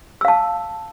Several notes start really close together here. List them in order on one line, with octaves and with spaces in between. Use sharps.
E6 F5 A5